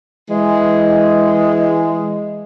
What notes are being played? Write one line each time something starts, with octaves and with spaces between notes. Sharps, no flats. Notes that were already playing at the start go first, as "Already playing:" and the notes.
E3 G#3